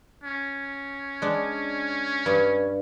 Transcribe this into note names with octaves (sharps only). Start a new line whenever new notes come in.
C#4
G#3 D4
G2